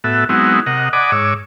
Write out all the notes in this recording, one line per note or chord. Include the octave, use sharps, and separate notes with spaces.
A2 B3 F#4 A4 E5
F#3 G#3 B3 C4 D#4 E4
C3 A#4 D#5 F#5
D5 D#5 F#5 G#5 B5 D6
G#2 C#5 D6 E6